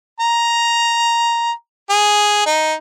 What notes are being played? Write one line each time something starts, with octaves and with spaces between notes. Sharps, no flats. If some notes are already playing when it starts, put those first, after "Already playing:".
A#5
G#4
D#4